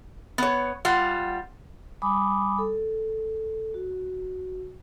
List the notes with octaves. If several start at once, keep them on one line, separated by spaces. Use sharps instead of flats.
B3 C#5
G3 F4 F#5
G3 G#5 B5 D6 D#6
A4
F#4